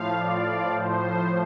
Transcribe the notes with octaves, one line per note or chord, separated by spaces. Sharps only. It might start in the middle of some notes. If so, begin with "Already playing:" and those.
Already playing: A2 F3 F5
D5
A2 F3 C5